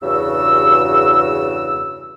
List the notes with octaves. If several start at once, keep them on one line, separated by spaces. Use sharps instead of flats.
E2 G2 C#3 F#4 E6